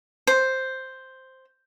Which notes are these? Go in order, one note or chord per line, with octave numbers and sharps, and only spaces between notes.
C5